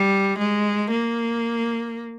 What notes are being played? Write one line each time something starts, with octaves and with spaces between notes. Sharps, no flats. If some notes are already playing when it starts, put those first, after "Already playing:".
Already playing: G3
G#3
A#3